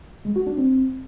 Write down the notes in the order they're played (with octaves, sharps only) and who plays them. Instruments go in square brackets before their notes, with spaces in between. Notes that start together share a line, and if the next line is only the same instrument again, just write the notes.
[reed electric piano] G#3
F#4
D4
C4